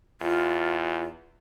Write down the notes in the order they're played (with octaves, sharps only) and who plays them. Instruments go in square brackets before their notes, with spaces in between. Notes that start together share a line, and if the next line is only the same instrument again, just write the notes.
[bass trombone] E2 [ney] F4